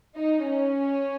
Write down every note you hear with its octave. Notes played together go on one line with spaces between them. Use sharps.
D#4
C#4